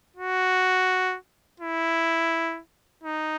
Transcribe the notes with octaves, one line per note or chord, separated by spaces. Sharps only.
F#4
E4
D#4